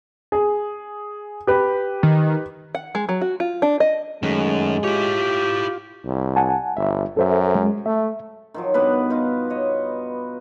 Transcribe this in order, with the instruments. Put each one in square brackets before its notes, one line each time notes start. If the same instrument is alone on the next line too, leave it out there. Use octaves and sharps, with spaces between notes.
[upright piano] G#4
G4 B4
[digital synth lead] D#3
[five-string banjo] F#5
G#3
F#3
F#4
F4
D4
D#5
[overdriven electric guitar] F#2 [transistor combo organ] D#3 A3 C#4 [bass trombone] G#3
[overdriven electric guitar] E4 C#5 [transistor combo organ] F4 [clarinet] G4
[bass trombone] C2
[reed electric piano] F#5 G#5 A5
[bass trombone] G1 [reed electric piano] E5
[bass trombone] F#2 [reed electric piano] A4 C5 E5
[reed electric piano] G#3
[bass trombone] A3 [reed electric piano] E5
[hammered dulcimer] D#3 F3 F#3
G2 B2 B3 B4
B3 D#4 F4
C#5 D#5